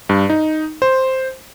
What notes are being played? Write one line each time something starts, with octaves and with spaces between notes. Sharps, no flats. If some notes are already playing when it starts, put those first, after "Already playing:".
G2
D#4
C5